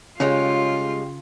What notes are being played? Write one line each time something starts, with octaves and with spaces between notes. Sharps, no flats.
C#3 G3 G#3 C#4 F4